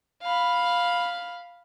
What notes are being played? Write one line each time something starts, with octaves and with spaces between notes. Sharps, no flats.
F5 B5